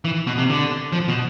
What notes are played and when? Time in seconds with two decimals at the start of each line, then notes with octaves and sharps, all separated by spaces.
0.05 E3
0.27 B2
0.38 C3
0.50 D3
0.93 F3
1.08 B2